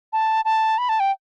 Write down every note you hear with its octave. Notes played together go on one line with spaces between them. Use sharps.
A5
A5
B5
A5
G5